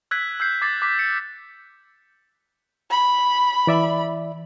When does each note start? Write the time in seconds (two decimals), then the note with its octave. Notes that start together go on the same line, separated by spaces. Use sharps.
0.11 E6 F#6 G#6 B6
0.40 E6 G6 C7
0.62 D6 G#6 A6 C7
0.82 D6 B6
0.99 C#7
2.91 B5
3.67 E3 D5 E5